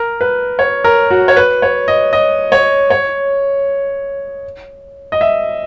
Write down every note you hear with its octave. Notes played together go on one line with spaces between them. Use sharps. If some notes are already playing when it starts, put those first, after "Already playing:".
Already playing: A#4
B4
C#5
A#4
F#4
C#5
B4
C#5
D#5
D#5
C#5
C#5
D#5
E5